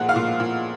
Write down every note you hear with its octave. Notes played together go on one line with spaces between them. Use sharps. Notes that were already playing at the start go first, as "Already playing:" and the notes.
Already playing: A#2 F3 G#3 F#5 F#6
F5 F6
A#2
A#2